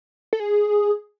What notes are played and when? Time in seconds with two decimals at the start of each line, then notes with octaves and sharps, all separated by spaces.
0.33 A4
0.40 G#4